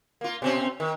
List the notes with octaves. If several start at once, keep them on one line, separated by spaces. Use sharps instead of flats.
A#3 F4
B2 C4 C#4
D#3